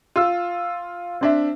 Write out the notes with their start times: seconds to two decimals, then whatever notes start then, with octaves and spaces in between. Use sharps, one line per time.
0.16 F4 E6
1.21 C4 D4 E5